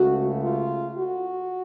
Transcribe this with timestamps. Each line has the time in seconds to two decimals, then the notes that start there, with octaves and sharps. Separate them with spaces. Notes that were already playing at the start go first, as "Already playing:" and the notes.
Already playing: C#2 C#3 A3 F#4
0.42 F4
0.95 F#4